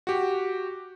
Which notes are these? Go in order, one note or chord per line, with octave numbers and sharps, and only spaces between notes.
F#4 G4